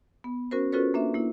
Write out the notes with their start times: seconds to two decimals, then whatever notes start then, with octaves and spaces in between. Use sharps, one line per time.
0.24 B3
0.51 C#4 F#4 A#4 C5
0.72 C#4 F4 F#4 A4 B4 C#5
0.94 A#3 D4 E5
1.14 A#3 E4